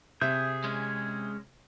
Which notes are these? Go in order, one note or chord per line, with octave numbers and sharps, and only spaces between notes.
C3 G#4 E5 G6
G#3 C#4